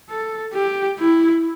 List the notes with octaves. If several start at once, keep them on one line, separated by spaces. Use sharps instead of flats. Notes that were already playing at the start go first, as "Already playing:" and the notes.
A4
G4
E4